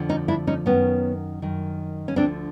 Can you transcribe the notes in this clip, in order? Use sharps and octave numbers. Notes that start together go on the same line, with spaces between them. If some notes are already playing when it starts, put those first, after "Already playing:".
Already playing: F2 D3 F3
C#4 D#4
D4 E4
C#4 D#4
F#2 D#3 B3 C#4
F#2 D#3
C#4
D2 D3 F3 C4 D4